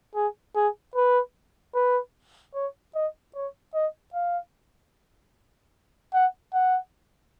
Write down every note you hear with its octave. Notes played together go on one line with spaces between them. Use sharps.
G#4
G#4
B4
B4
C#5
D#5
C#5
D#5
F5
F#5
F#5